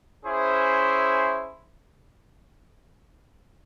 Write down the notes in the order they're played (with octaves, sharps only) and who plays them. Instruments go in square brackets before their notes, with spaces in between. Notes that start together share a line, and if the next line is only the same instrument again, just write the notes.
[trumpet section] C#4 E4 G#4 C5 E5